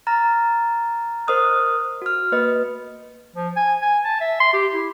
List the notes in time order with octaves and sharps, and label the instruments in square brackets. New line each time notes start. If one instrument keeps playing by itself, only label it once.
[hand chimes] A#5 F6 A6
A#4 C5 D#5 D#6 F6 F#6
F#4 F6
A#3 B4 D#5
[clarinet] F3
G#5
G#5
A5
E5
C6
G4
E4